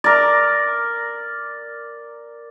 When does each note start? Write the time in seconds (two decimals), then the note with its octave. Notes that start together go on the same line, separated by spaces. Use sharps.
0.04 A#4 D5